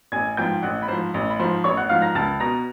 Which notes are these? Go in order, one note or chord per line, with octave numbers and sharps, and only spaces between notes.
A1 G#5 G#6
G#2 F3 G5 G6
A1 F#5 F#6
B5
G#2 F3 C5 C6
A1
B5
G#2 F3 C5 C6
A1 C#5 C#6
F#5 F#6
G#2 F3 F5 F6
A#5 A#6
C#2 A5 A6
B2 A#5 A#6